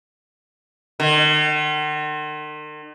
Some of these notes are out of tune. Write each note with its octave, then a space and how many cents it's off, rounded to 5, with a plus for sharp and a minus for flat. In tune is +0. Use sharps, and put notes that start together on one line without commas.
D#3 -45